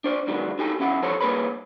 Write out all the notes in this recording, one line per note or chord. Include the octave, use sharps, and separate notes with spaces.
D4 C5 D5
G2 D#3 F#3 G#3 B3 D4
D#4 F#4 G4 A4 G5 G#5
E2 C#4 E4 F#5
E3 F3 G3 A4 C5 C#5
G3 A#3 G#4 B4 C#5 B5